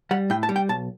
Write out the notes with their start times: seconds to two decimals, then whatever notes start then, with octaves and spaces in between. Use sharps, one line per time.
0.11 G3 F#5
0.30 A2 G5
0.43 A5
0.49 G3
0.56 G5
0.69 B1 A5